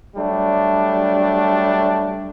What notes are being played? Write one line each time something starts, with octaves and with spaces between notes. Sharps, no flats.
F#3 G3 A3 D4